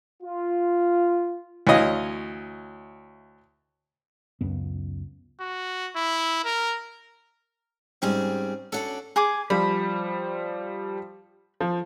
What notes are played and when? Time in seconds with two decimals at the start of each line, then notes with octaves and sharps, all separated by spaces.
0.23 F4
1.67 D2 E3 C#5 D#5 F5
4.41 C#2 F#2 B3
5.40 F#4
5.96 E4
6.45 A#4
8.02 G#2 G3 C4 C#4 G#4
8.72 C#4 D4 F#4 A4 F#5
9.16 G#4 G#5 D6
9.50 F3 G3 B5
11.61 F3